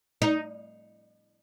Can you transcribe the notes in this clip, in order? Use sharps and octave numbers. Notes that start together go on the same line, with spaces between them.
D#4